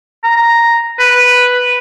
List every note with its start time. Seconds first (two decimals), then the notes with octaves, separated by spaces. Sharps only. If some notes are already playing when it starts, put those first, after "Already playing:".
0.24 A#5
0.99 B4